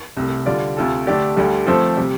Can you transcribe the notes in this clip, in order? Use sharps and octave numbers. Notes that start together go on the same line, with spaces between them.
C2 C3 A3
D3 G3 F4 D5
D2 C3 A3 F4 A4
D3 A3 D4 G4 D5
D2 D3 G3
F3 A3 C4 A4 C5
C3 G3